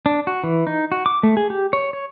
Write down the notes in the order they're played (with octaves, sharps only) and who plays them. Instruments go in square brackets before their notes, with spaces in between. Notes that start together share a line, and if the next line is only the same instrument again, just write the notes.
[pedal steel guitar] D4
F#4
E3
D#4
F#4
D6
A3
G#4
G4
C#5
C#5